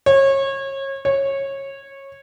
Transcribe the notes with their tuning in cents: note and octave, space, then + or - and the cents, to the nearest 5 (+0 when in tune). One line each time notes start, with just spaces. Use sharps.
C#5 -30
C#5 -20